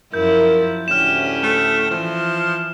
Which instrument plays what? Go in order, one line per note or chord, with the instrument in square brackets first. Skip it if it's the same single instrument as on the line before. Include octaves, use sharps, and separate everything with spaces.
[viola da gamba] F#2 F3 E4 [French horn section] A#4 [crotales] G6
[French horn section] D2 A2 [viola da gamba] C#4 G4 [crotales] F6 E7
[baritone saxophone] A3
[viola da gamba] E3 [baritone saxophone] F3